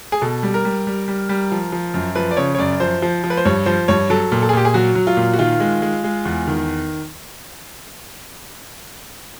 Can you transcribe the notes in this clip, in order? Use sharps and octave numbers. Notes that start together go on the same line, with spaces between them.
G#4
B2 A4
G3
A#4
G3
G3
G3
G3
F3
F3
F#2
F3 B4
D5
C#3 C#5
C#5
F#2 D5
F3 C5
F3
F3
B4
C5
G2 C#5
F3 C5
G2 C#5
F#3 A4
A#2
A4
G#4
A#2 G4
G#4
F#3 F#4
F#3
F4
A#2
F#4
D#3 F4
G#3
G#3
G#3
E2
D#3